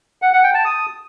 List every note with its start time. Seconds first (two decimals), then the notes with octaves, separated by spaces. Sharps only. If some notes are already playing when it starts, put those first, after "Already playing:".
0.22 F#5
0.33 F#5
0.44 G5
0.54 A5
0.65 D#6